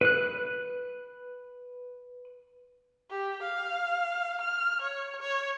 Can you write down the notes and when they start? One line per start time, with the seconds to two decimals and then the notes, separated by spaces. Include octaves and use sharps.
0.01 B4 F#6
3.10 G4
3.42 F5
4.41 F6
4.81 C#5
5.21 C#5